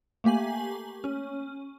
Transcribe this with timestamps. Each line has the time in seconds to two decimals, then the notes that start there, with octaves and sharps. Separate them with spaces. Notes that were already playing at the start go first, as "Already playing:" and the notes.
0.24 A3 A#3 G4 G#5 F#7
1.04 C#4